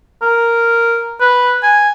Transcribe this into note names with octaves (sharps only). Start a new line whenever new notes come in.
A#4
B4
G#5